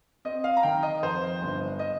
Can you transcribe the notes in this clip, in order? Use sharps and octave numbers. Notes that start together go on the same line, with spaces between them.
C4 D#5
F5
A#5
D#3 G5
D#5
F2 C5
G1
D#5